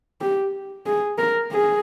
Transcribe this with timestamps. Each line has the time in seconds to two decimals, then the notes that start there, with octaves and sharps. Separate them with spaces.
0.21 G4
0.86 G#4
1.18 A#4
1.52 G#4